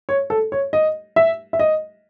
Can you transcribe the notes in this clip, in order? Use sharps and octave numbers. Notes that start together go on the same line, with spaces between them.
C#5
A4
C#5
D#5
E5
E5
D#5